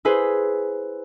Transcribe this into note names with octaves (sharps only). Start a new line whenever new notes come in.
E4 G#4 B4 C5